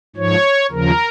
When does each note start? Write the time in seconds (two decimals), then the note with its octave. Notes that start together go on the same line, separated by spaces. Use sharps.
0.16 G#2 F3 C#5
0.71 D#2 C#3 F3 A#4